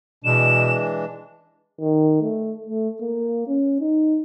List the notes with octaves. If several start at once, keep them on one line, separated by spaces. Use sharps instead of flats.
B2 E3 G#3 D4 E7
D#3
A3
A3
A#3
C#4
D#4